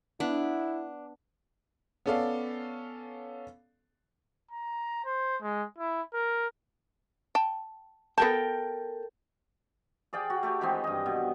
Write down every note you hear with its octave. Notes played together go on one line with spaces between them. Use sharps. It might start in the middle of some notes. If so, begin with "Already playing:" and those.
B3 D4 E4
B3 C#4 A4 D5 F5
A#5
C5
G#3
E4
A#4
G5 A5
B3 A4 A#4 G5 A5
G#4 D5 F5 G5
F#4
A3 G4
D#3 E3 G#3 C4
G2 D#5
B2